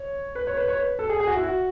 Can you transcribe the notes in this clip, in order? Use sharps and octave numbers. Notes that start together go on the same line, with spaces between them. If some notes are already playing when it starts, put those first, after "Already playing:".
Already playing: C#5
B4
C#5
B4
C#5
B4
A4
G#4
G#4
F#4
E4
F#4